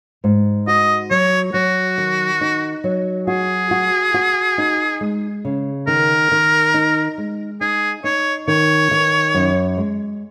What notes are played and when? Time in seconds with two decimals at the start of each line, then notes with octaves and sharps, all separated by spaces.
0.24 G#2
0.67 F#4 D#5
1.10 F#3 C#5
1.54 F#3 F#4
1.98 D#3
2.41 D#4
2.84 F#3
3.27 F#4 G#4
3.71 F#4
4.14 F#4
4.58 D#4
5.01 G#3
5.45 C#3
5.87 D#3 A#4
6.32 D#3
6.74 D#4
7.18 G#3
7.61 D#4 G#4
8.04 D#4 C#5
8.48 D#3 C#5
8.91 D#3
9.35 F#2
9.77 G#3